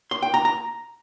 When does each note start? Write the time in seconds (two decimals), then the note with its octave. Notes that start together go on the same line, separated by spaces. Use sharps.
0.11 C6
0.23 G5
0.34 A#5
0.45 A#5